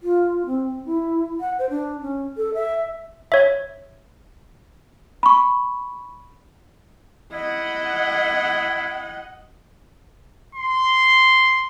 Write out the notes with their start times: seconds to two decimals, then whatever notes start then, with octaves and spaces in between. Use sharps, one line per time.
0.03 F4
0.46 C4
0.85 E4
1.40 F#5
1.59 C5
1.70 D4
2.01 C#4
2.37 A4
2.54 E5
3.32 C#5 E5
5.23 B5 C#6
7.32 E4 D#5 F#5
10.55 C6